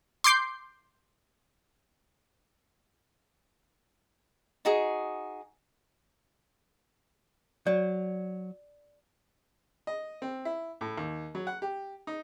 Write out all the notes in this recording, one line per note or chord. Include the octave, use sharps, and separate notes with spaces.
C6 D6 G6 C7
D#4 F#4 G#4
F#3 D5
D#5
C4
E4
A2
D#2
F#3
F#5
G4
D#4